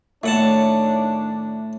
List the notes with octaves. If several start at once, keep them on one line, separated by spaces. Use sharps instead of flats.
A2 D#3 D4 C#5 E5 F#5 A5